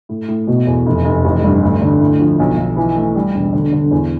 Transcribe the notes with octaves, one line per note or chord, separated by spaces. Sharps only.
A2
A2
B2
E2
F1
F1
A1
G2
D2
D3
A2
F3
B1
B1
E3
A3
G3
E1
D3
D3
E2